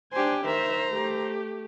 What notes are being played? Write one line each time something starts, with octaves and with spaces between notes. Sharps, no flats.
D4 G4 C5 G#5
D#3 C5 E5 A#5
A3 G4